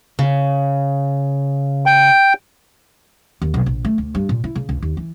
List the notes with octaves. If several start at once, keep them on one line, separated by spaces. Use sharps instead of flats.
C#3
G5
D#2
B1
A#1
A3
D2
G2
A#2
E4
C#3
C#2
D#2
E3